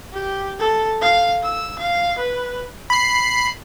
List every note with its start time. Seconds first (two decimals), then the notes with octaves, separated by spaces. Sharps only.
0.14 G4
0.59 A4
1.02 F5
1.43 E6
1.79 F5
2.18 B4
2.90 B5 C7